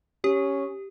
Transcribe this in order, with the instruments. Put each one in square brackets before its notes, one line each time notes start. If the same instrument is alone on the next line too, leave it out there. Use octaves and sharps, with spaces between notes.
[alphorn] C#4 [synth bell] G4